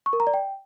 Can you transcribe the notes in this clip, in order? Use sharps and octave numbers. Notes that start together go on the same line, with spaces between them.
C#6
A#4
A#5
D5
G5